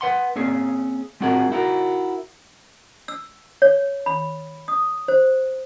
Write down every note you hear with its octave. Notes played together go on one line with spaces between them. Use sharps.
B4 F#5 C6
A#3 C4 C#4 G#4
G#3 C4 F4 F#4 G#4 A#4
D#4 E4 F#4 A#4
E6
C#5
B5
D#6
C5